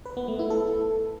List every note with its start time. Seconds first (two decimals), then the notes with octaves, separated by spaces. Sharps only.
0.06 B4
0.17 B3
0.28 A3
0.39 E4
0.50 A4